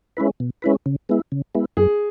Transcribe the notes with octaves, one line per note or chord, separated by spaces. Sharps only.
G#3 C#4 E4 B4
B2
G#3 C#4 E4 B4
C#3
G#3 B3 E4
C#3
G#3 B3 E4
F#2 G#4